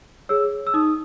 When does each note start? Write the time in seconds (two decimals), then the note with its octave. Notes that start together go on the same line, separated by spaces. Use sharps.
0.29 G#4 C#5 E6
0.67 E6
0.74 D#4 D#6